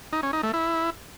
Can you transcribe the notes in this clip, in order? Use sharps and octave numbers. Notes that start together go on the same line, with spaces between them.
D#4
C#4
D#4
A3
E4